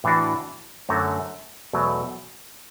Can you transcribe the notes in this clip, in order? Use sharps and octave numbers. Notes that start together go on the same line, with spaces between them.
A2 E3 D4 F#4
F#2 D3 F#3 A3 F#4
E2 B2 F#3 A3